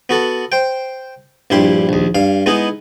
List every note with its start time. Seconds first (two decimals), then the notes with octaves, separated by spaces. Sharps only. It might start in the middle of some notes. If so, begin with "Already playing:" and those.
0.09 B3 F#4 A4
0.52 C5 G5
1.50 A#1 G2 E4 G4 C6
1.89 A#1 D#2
2.15 G2 F5
2.46 G#3 B3 D#4 E4